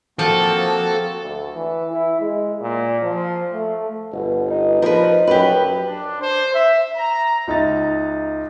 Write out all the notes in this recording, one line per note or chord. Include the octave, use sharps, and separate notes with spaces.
F3 A#3 C4 F#4 A4
D2
E3
E4
G#3
A#2
F3
A3
G1 B2
D#4
F3 D#4 A#4 B4
F#2 G4 B4
D4
C5
E5
A#5
C#2 D#4 E5 A6